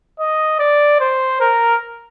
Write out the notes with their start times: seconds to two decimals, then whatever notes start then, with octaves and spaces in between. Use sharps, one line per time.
0.19 D#5
0.59 D5
1.00 C5
1.40 A#4